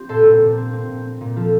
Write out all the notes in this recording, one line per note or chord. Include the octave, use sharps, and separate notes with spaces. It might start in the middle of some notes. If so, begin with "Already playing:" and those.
Already playing: C4 F4 G4
A#2 A4 C5
A#2
A#2
C4
C4
A#2
C4
A#2
F3 F4 A4